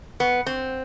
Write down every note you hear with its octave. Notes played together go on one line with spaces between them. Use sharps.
B3
C4